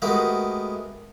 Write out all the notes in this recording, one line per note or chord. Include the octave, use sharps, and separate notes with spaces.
G#3 A3 B3 F#4 G4 A#4